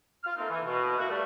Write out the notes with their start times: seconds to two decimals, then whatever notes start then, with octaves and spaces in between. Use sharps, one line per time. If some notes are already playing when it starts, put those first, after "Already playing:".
0.24 F4 F6
0.37 A3 A#3 C4 D#4 F4
0.49 E3
0.65 B2
0.97 A#3 E4 F#4
1.09 G3 A3